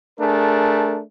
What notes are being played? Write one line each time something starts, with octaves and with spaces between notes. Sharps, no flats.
A3 D4 G#4 A#4